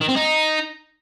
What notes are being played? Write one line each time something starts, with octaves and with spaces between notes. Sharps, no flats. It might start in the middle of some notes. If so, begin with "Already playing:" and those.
D#3
C4
D#4